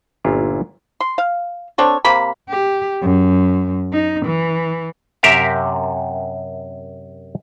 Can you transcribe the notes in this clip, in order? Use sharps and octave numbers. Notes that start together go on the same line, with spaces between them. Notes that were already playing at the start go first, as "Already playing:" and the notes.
G1 A#2 C#4 D4 E4 F4
C6
F5
C4 D4 A4 C#5
C3 A#3 B5
G4
F#2
D#4
E3
F#2 C3 G4 A#4 E5 F5